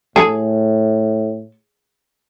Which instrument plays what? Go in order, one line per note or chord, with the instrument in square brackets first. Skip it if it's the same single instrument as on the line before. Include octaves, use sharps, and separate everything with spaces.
[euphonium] A2 [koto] G#4 [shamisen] A4